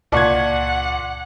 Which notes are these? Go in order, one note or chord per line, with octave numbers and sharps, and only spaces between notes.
C#2 A#2 D5 F#5 A5 C#6 F#6 G#6